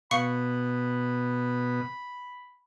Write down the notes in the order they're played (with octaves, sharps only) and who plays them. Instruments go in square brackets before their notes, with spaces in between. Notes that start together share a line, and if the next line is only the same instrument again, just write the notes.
[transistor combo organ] B2 [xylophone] F5 C#6 C#7 [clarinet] B5